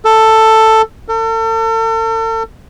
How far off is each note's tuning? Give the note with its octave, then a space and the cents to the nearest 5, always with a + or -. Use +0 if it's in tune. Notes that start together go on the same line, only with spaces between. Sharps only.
A4 +10
A4 +40